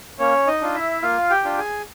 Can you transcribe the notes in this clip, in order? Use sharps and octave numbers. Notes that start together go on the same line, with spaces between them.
A#3 C#4 C#5
D#4 D#5
D4 F4
E4 E5
A#3 F4 F5
G4 G5
D4 F4
G#4 G#5